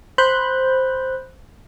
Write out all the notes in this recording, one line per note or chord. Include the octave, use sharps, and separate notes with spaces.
C5 B5 F#6 G6